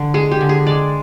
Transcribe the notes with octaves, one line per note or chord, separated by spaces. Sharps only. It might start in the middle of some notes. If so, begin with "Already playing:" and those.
Already playing: D3
G#3 G#4
G4
D3
G#4
G#3 D5